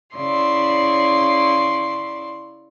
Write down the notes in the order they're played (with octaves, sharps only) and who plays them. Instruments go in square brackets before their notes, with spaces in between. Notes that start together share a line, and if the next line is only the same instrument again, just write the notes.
[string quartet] C#3 E4 D5 C6